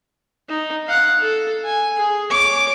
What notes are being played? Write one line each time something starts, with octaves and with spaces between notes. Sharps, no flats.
D#4
F5 F#5
A4
G#5
G#4
C#5 D6